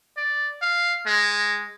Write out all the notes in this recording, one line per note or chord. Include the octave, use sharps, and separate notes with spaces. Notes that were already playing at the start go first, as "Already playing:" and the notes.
D5
F5
G#3